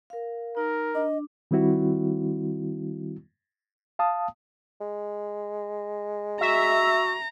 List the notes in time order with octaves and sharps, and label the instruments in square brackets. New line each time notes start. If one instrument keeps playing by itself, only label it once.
[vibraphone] A#4 F5
[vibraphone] D#4 [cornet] A#4
[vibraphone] D4 [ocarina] D#5
[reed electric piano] D#3 G3 C4 E4 F#4
F5 A5 D#6
[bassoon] G#3
[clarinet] F#4 [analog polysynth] E5 [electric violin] A#5